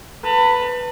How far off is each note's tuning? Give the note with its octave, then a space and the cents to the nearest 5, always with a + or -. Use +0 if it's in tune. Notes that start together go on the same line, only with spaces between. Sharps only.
B4 +0 A5 +40